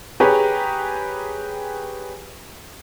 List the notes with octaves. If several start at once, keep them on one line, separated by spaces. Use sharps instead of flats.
G4 G#4 B4 C#5 A#5